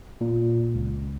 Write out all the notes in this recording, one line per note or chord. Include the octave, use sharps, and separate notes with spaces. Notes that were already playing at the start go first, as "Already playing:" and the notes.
A#2
C#2